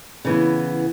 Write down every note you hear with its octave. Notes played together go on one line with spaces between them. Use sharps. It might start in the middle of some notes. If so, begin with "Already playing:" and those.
C#3 E3 B3